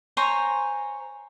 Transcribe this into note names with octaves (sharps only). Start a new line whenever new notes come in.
C5 C#5 G#5 A#5